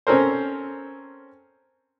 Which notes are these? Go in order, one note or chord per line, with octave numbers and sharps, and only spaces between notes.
C4 C#4 A4 A#4 C5